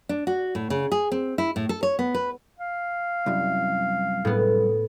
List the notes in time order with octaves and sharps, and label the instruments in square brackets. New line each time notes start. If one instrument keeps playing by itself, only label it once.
[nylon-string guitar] D4
F#4
A2
C#3
G#4
C4
E4
A2
A4
C#5
B3
B4
[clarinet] F5
[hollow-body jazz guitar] C2 F#2
[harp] A2 B3